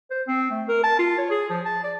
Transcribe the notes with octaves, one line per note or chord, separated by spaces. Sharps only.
C5
C4
A3
A#4
A5
F4
C#5
G#4
F3
A5
D5